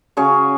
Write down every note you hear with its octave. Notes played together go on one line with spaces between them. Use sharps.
C#3 F#3 C#4 G#4 C#5